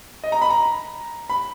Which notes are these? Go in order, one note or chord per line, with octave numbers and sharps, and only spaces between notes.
D#5
A#5
B5
A#5
B5